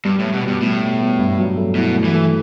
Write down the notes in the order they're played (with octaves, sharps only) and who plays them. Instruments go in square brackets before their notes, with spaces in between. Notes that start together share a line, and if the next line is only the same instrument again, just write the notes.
[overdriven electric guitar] G2 [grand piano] G3
[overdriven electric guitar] A2
[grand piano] G3
[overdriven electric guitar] B2
[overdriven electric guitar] G2 [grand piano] B2
[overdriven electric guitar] A2 [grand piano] G3
[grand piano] B2
B3
G2
F#3
A3
[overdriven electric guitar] B2 [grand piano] E4
[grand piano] A3
[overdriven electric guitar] E3
[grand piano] A3